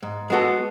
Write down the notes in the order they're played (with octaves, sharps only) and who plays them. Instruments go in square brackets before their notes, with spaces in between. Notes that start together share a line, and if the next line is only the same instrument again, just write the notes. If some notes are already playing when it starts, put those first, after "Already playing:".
[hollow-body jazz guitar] G#2
G#3 B3 F#4 A4